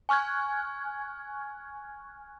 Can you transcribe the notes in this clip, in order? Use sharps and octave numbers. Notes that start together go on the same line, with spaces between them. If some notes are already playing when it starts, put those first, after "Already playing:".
G#5 C#6 F6 F#6 G#6